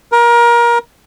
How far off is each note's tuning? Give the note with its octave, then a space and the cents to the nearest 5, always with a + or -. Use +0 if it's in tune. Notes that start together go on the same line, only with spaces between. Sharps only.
A#4 +25